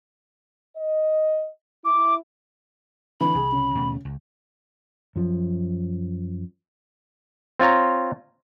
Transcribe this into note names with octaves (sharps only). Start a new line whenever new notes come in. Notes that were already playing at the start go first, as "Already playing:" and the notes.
D#5
E4 D6
D3 E3 D4 B5
C2 G#4
C#3
D#2 B2 A3
C#2
F#2 F3
C4 F4 C#5 A#5